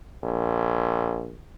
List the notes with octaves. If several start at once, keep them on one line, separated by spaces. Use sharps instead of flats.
A#1